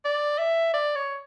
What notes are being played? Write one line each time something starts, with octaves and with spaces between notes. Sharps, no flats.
D5
E5
D5
C#5